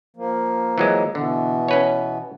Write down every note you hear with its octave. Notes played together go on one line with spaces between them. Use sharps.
F3 A#3
E3 F#3 G#3
B2 D3 E3 B3
C#4 B4 C#5